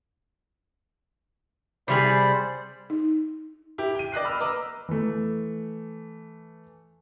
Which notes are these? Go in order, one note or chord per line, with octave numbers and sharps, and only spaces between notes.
C3 G3 G#4 C5 D5 B5
D#4
E4 G4
G5 D#7
D5 D#5 F#6 C7
B5 E6 F6
B4 D#5 A#5 D6 E6
E3 A3